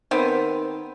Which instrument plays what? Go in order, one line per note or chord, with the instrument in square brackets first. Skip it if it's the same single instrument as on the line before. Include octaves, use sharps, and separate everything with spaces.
[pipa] D#3 B3 C4